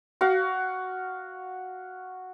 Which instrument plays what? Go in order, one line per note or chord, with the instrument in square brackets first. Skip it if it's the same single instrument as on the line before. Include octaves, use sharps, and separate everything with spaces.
[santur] F#4 F5